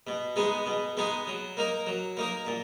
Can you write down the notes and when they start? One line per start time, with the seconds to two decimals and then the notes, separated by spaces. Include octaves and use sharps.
0.07 B2
0.36 G#3 B3 D#4 G#4
0.66 B2
0.97 G#3 B3 D#4 G#4
1.27 F#3
1.57 A#3 D#4 A#4
1.87 F#3
2.17 A#3 D#4 A#4
2.47 A#2